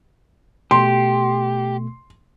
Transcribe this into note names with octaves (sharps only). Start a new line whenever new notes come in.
B2 A3 G4 C6